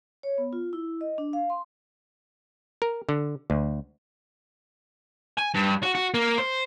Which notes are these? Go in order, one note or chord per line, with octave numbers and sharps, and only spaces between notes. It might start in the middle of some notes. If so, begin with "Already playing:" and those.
C#5
B3
F4
E4
D#5
D4
F5
C6
A#4
D3
D2
G#5
G2
F#4
F#4
A#3
C5